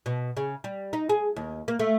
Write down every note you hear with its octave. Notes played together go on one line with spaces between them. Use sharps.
B2
C#3
G3
D#4
G#4
D#2
A#3
A3